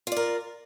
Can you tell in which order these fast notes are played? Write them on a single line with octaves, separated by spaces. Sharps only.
F4 D5 A#4